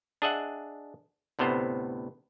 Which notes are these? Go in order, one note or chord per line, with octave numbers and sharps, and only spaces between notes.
D4 G#4 D#5 E5 F#5
D2 A2 C3 B3 C5